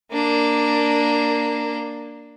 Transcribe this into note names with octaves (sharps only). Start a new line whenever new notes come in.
A#3 D4